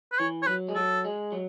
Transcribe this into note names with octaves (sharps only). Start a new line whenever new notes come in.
B4
E3 C#5
C#5
F#3 B4
G#3
F#3 A4
G#3
F#3